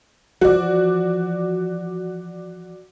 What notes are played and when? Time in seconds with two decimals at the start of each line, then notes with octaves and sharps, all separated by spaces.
0.41 E3 F3 F#4 D5